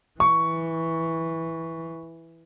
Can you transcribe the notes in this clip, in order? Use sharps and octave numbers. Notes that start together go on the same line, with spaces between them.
E3 C#6